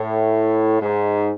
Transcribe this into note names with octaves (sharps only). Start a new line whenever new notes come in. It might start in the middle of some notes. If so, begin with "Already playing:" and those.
Already playing: A2
G#2